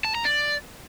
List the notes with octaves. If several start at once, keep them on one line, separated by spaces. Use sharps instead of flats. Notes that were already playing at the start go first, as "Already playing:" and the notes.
A5
A#5
D5